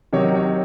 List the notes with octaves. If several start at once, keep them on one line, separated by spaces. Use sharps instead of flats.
C3 D#3 F#3 C#5
C#5